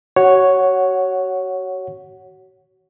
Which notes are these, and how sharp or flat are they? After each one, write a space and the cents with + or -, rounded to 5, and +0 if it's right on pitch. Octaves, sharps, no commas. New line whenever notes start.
F#4 +30 C#5 +0 F#5 +0